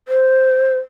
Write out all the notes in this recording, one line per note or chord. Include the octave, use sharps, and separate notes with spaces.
C5